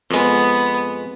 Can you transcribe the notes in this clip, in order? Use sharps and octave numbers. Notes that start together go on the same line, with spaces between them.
F2 G#3 B3